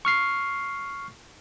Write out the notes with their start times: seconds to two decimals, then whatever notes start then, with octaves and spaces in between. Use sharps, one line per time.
0.05 C#6 F6 C7